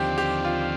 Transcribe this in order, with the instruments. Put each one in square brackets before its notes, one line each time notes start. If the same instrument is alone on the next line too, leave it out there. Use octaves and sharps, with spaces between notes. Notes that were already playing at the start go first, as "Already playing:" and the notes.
Already playing: [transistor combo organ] D#2 D3 F3 C4 [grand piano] G4
[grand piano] G4
F4